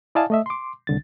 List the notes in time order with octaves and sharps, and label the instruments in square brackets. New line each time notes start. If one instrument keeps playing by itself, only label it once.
[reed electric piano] E4 D5 D#5 F5 G#5 A5
A3 D#5 E5
C6 D6
C2 D3 A6